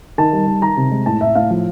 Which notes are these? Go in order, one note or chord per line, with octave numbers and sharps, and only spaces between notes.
D#3 A5
G3
D#3
D#3 A#5
C3
G#3
A2 A5
A2 E5
A2 F5
F3